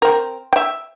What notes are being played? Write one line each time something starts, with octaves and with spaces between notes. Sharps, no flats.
C4 A#4
E5 G5